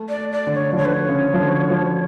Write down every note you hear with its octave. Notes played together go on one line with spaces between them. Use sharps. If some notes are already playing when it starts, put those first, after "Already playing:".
Already playing: A3
D5
A3
D5
D3
C#5
F3
D3 C#5
B4
C#5
C#3
F3
D3
F3